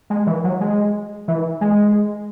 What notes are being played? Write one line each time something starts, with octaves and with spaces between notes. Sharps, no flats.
G#3
E3
F#3
G#3
E3
G#3